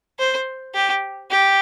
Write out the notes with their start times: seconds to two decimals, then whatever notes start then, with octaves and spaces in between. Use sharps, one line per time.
0.19 C5
0.74 G4
1.31 G4